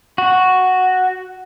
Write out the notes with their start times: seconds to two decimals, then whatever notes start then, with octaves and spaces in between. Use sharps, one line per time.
0.18 F#4